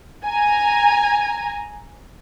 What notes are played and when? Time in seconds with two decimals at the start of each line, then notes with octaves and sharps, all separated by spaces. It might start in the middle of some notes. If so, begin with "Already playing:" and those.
0.24 G#5 A#5